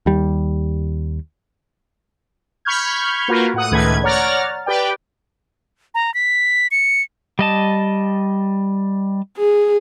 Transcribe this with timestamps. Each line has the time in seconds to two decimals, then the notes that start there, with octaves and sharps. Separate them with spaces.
0.06 D#2 G3
2.65 B5 C#6 F6 G6 G#6
3.28 A#3 F4 F#4 A#4 B4
3.54 A2 F#5 D#6
3.71 C#2 A2 D#3 A3 B4 G#6
4.03 C#5 D5 F#5 A#5 F6 A6
4.66 G4 B4 D5 G5
5.95 A#5
6.14 B6
6.71 C#7
7.39 G3 D#5 A5
9.37 G#4